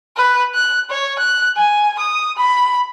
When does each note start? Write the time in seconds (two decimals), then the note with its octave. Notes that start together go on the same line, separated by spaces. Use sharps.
0.17 B4
0.54 F#6
0.90 C#5
1.18 F#6
1.57 G#5
1.99 D#6
2.37 B5